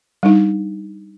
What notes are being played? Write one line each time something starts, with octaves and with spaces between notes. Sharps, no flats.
G3 D4 D#4